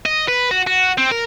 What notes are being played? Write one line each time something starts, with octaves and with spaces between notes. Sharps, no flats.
D#5
B4
F#4
F#4
C4
A#4